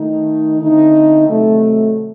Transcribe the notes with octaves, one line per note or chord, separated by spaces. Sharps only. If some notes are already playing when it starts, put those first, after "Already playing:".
Already playing: D#3 A3 D#4
D3 A3 C4 D#4
C3 D#3 F#3 A3